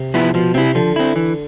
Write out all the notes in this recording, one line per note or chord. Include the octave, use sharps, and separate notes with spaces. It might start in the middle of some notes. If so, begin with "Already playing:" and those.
Already playing: C3
F3 B3 E4
B2 F3
C3 C4 E4
D3 F3
C4 E4
E3